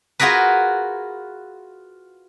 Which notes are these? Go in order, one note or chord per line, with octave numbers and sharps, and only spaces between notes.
F4 F#4 G#4 A#4 B4